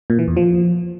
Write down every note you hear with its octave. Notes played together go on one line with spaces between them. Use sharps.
A#2
E3
E2
F3